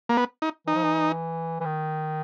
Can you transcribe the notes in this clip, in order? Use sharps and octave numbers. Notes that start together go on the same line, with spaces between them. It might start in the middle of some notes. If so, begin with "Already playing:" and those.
A#3
B3
D#4
E3 D#4
F3
E3
E3
D#3